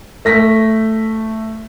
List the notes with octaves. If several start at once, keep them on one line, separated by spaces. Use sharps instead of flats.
A3 A#6 B6